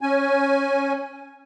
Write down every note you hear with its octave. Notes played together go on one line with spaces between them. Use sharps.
C#4 G#5